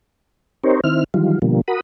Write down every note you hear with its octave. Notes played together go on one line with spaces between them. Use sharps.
C4 D#4 G4 A#4 C5 C#5
D#3 C4 E4 F6
D#3 E3 F#3 G3 F4
B2 D3 F3 G3 A#3
F#4 A#4 F#5 B5 D#6